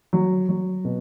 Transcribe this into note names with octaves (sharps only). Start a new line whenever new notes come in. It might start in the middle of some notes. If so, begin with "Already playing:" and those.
F#3
F#3
B2